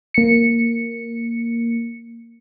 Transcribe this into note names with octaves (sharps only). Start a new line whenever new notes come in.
A#3 C#7